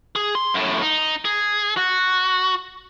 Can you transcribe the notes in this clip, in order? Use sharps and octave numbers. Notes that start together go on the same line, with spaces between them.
G#4
C6
F#2 A2
D#4
G#4
F#4